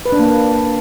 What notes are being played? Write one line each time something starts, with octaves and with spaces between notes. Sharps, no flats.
B4
D4
A#3